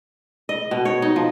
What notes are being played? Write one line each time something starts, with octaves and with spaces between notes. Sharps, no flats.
D#5
B2
C#5
D#4
F3